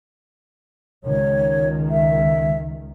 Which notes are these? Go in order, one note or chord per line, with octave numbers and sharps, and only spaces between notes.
C#2 D#3 C#5
E5